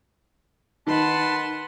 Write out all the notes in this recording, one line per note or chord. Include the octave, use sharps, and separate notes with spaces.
D#3 D#4 B4 F#5 A5 C6